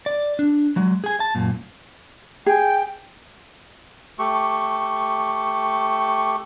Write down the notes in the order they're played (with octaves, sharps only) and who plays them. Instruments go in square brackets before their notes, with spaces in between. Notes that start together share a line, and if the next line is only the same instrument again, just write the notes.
[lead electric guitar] D5
D4
F#3 G#3
G#4 G#5
A5
F#2 A#2
[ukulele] G#4 [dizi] G5
[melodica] A3 G4 C#6